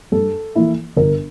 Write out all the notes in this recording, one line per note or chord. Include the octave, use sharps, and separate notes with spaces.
G2 A4
E3 A#3 E4
G1 A#4